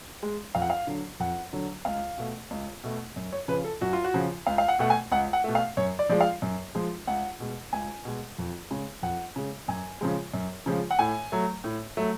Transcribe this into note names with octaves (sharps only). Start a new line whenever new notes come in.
G#3
F2 F5
F#5
F5
D3 F#3
F2 F#5
D3 F#3
C#2 F5
B2 A3
C#2
B2 A3
F#2
C#5
C#3 F3 B4
A4
F#2 F#4
F4
F#4
C#3 F3
C#2 F5
F5
F#5
B2 A3 F#5
G#5
C#2 F#5
F#5
B2 A3
F5
F#2 C#5
D5
F3 G#3 D5
F5
F#2
F3 G#3
C#2 F#5
B2 G#3
C#2 G#5
B2 G#3
F2
C#3 G#3
F2 F#5
C#3 G#3
F#2 G#5
C#3 F3 G#3
F#2
C#3 F3 G#3
F#5
A2 G#5
F#3 A3
A2
F#3 A3